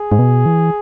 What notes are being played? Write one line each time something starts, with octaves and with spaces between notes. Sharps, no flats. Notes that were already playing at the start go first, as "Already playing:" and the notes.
Already playing: G#4
G#2
B2
E3